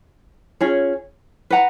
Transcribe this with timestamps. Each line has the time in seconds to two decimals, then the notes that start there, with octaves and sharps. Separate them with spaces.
0.61 C#4 F4 G#4 C#5
1.50 B4 F#5 A#5